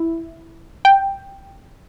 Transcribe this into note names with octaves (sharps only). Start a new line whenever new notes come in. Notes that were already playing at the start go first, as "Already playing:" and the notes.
Already playing: E4
G5